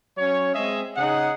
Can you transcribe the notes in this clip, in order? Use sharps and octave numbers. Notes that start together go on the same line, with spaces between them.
F#3 C#4 C#5
G#3 C4 G#4 D#5 E5
C#3 D#4 G#4 F#5